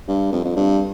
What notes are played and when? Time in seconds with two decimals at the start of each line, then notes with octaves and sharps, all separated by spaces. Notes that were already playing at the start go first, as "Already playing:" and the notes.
0.08 G2
0.33 F2
0.45 F2
0.56 G2